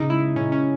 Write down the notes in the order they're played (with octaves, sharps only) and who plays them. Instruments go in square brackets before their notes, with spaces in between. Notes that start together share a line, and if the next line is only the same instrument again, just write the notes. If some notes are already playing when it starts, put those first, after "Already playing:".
Already playing: [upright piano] C#3 [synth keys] D#4
[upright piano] G#3 [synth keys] E4
[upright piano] C#3 [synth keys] C#4
[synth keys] C#4